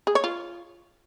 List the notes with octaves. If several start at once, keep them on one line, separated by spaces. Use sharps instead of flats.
G#4
C#5
F4